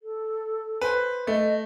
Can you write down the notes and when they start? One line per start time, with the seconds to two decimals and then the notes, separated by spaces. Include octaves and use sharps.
0.02 A4
0.81 B4 C5
1.27 A3 D#5